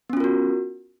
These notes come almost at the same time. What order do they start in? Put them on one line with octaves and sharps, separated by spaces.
B3 C#4 F4 A#4 F#4